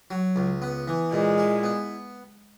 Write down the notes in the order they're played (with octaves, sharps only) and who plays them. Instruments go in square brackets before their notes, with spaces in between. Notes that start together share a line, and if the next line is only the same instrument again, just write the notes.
[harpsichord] F#3
C#2
B3
E3
[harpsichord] A#2 [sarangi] G#3
[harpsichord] E4
B3